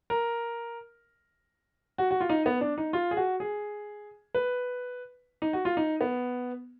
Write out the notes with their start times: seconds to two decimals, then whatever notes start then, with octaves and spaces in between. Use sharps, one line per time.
0.10 A#4
1.98 F#4
2.11 F#4
2.21 F4
2.29 D#4
2.46 B3
2.61 D4
2.78 D#4
2.93 F4
3.11 G#4
3.17 F#4
3.40 G#4
4.35 B4
5.42 D#4
5.53 F#4
5.65 F4
5.77 D#4
6.01 B3